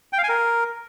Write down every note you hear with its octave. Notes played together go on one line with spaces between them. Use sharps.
G5
F5
G#5
A#4